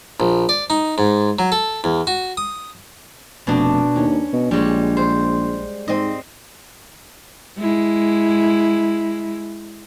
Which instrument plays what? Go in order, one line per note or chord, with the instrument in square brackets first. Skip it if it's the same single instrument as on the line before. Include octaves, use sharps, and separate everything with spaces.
[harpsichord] A#1
D5
D#4
G#2
F#3
A4
E2
F#4
D#6
[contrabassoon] F1 [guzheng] B2 D4
[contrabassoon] D#2 [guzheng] C#4
[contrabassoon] B2
[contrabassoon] A#1 [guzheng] G3 G#3 C#5
[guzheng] C5
[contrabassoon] G#2 [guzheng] C4 D#5
[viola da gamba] G#3 E4